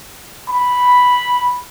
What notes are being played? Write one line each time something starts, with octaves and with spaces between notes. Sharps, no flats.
B5